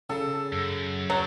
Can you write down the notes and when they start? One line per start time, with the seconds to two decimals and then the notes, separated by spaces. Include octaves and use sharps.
0.10 C#3 A4
0.53 F#2
1.10 F#3 A4 C5